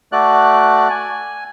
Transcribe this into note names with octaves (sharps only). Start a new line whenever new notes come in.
A3 F#4 D5 F#6
G#5